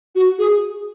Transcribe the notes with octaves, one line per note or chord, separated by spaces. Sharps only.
F#4
G#4